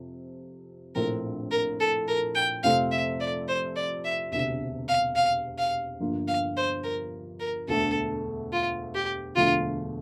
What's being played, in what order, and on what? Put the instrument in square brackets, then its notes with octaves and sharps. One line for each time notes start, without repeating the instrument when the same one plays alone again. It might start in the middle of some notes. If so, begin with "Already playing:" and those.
Already playing: [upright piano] F2 C3
[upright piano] A#1 A2 F3 A3 C4 [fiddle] A#4
[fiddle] A#4
A4
A#4
G5
[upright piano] F2 C3 F3 A3 C4 [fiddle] F5
[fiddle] E5
D5
C5
D5
E5
[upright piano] E1 D2 C3 [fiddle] E5
[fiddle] F5
F5
F5
[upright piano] G1 G2 F3 A#3 F4
[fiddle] F5
C5
A#4
A#4
[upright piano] E1 D2 D3 A3 [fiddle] A4
[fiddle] F4
G4
[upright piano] E1 D2 D3 F3 A3 [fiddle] F4